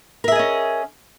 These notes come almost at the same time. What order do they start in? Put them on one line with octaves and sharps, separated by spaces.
A#4 E5 G#4 D#5 C#4